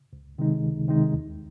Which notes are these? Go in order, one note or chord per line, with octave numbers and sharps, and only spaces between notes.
C#2
C3 D#3 G#3 D#4
C#2
C3 D#3 G#3 D#4
D#2